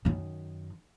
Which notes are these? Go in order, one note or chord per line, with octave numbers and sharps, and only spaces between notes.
F#2 D#3